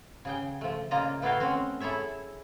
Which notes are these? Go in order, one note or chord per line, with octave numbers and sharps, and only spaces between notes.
C#3 G#4 G5
F3 A3
A#2 C#3 A#3 F4 D#5 A#5
A3 B3 E4 F#4 F5 G5
C4 C#4 F#4
E4 G#4 A4 C#5 E5